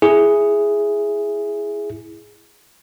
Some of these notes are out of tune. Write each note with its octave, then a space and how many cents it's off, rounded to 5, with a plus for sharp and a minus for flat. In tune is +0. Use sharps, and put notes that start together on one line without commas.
E4 +0 G#4 +0